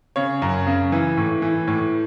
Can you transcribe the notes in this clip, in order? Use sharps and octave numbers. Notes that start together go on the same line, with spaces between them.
C#3 C#5
F#2
C#3
E3
A2
E3
A2